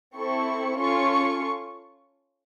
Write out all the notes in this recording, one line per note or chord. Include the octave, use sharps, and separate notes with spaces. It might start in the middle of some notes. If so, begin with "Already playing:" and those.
C4 E4 A4 C#6
C#4 F4 A4 C#6